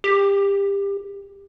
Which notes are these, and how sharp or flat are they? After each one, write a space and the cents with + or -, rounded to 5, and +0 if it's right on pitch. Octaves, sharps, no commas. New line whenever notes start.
G4 +25